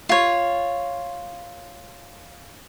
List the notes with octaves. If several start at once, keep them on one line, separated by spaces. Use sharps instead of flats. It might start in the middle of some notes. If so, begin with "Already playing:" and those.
F4 C#5